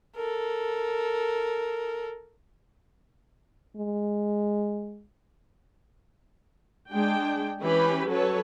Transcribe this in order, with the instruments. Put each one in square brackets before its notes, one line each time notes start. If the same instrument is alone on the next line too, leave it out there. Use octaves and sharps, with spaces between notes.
[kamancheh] A4 A#4
[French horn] G#3
[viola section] G#3 D4 G5
E3 C#4 G4 B4 B5
F#3 A4 B4 C#5